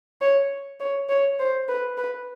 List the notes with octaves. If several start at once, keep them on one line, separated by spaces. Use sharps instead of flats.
C#5
C#5
C#5
C5
B4
B4